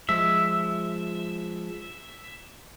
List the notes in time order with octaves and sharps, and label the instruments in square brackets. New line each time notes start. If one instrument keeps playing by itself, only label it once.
[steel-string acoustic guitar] F3 G#3 [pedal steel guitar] E5